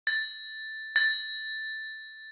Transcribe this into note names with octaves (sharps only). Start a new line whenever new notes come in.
A6
A6